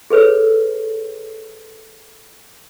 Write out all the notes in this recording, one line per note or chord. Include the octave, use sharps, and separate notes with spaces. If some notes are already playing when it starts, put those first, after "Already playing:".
G#4 A4 B4 C#5